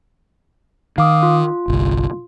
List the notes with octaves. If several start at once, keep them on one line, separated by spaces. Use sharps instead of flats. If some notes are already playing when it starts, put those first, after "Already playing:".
D#3 F5 D6 D#6
F4
G1 C2